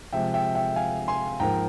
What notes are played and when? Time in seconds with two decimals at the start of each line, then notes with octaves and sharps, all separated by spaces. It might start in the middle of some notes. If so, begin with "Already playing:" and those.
0.12 C3 F3 G#3 E5 G5
0.34 E5 G5
0.55 E5 G5
0.76 F5 G#5
1.08 G#5 C6
1.40 G#2 F3 A#3 G5 A#5